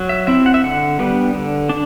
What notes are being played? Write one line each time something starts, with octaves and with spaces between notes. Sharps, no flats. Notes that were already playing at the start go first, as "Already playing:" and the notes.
Already playing: F#3
E5
C4 E4 E5
F#5
E5
D3 F#5
G3 B3 D4
D3
D4